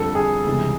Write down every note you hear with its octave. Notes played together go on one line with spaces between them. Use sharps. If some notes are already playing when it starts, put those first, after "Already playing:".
Already playing: F2 D3 G3 A4
G#4
C#2 C3 E3 G3